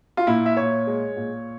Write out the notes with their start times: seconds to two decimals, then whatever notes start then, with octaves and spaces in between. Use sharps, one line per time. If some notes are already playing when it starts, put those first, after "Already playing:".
0.17 F4
0.27 A#2 E4
0.46 E5
0.57 A#2 C#5
0.87 G#3
1.17 A#2